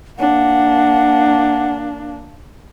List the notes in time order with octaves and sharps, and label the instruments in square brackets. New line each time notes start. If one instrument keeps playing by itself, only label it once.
[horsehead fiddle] A#3 D4 [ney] F#5